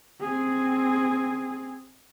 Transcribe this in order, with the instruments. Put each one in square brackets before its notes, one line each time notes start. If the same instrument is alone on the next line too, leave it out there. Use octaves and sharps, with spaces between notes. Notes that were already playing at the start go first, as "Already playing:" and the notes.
[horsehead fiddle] C4 G#4